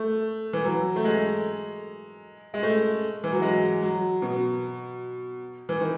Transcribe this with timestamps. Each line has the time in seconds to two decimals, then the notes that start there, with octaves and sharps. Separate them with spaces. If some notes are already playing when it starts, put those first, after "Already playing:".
Already playing: A3
0.53 E3
0.65 F#3
0.96 A3
1.04 G#3
2.54 G#3
2.63 A3
3.24 E3
3.32 F#3
3.42 G#3
3.82 F#3
4.22 B2
5.69 E3
5.81 D#3